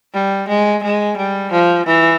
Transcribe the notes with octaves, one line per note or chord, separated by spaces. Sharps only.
G3
G#3
G#3
G3
F3
E3